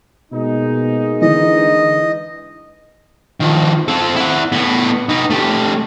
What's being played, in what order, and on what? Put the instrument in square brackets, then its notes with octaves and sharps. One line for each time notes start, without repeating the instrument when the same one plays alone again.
[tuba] B2 [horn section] G#3 A#3 D#4
[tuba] D3 [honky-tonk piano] E3 [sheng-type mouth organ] D#5
[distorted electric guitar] D#3 F3
C4 A4
E4 F#5
A2 B3
D#4 B4
A3 G4